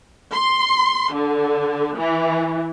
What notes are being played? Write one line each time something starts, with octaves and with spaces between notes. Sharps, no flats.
C6
D3
E3